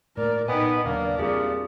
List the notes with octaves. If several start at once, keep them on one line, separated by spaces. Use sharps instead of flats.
A2 A3 A#3 A#4 D5
A#2 B3 D#4 D#5 E5 G5 G#5
D#2 C#3 F#3 A#3 D4 D5
E2 A#2 G3 C4 G4 G#4 E5